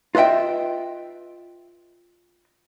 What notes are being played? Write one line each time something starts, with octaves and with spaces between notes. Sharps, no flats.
F4 B4 D#5 E5 G5